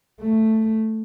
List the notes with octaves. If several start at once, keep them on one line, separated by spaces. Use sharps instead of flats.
A3